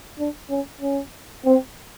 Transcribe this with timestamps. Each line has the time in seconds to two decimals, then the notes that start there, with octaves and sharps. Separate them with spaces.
0.19 D4
0.50 C#4
0.81 C#4
1.46 C4